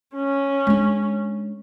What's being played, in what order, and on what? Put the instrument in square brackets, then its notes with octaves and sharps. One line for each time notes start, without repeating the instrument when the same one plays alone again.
[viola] C#4
[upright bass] G#3 D4